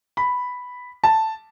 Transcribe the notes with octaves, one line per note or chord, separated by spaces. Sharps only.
B5
A5